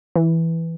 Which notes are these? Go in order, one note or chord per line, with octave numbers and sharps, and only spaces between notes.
E3